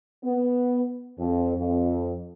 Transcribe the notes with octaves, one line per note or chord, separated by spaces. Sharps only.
B3
F2
F2